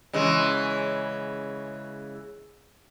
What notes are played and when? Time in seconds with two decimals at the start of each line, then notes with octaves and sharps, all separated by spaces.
0.13 C#3 E3 G#3